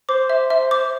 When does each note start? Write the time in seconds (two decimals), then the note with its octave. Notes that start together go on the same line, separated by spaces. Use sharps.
0.09 C5 D6
0.30 E5
0.50 E5
0.71 D6